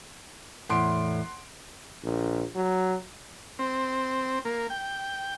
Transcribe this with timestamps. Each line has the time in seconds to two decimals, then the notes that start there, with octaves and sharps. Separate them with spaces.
0.69 E2 A2 F#5 C6 D7
2.04 A#1
2.55 F#3
3.59 C4
4.45 A#3
4.70 G5